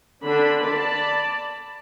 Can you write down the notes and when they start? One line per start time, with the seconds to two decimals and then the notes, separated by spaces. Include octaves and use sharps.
0.23 D3 D4 B5
0.67 D5 A5 B5